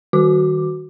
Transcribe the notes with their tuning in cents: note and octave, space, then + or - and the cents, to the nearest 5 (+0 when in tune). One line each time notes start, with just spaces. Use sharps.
D#3 +0 F#4 +0 D6 +5